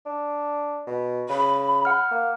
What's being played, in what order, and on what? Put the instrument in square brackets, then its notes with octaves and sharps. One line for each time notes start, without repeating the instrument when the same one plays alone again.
[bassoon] D4
B2
[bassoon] C#3 [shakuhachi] B5
[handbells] F#5 F6
[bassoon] A#3